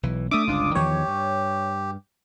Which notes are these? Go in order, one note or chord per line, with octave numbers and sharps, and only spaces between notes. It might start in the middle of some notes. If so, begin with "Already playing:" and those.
B1 E3
A3 D4 E5 D6 D#6
G1 C#2 D4 F4
E2 D#3 F3 G4 C#5
G2